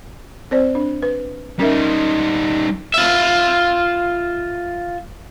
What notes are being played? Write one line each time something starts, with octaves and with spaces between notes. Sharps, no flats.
C4 C5 D5
D4
B4
G3 C#4 D#4 A#4 E5
F4 E5